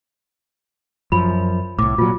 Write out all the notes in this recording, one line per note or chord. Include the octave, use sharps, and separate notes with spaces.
F#2 F3 B5
C2 A2 D6
A#2 F#3 F4